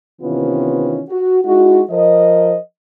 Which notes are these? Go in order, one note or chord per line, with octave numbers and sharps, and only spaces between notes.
C3 D#3 E3 B3 C#4 F4
F#4
G#3 D#4 E4 F#4
F3 A#4 C5 D#5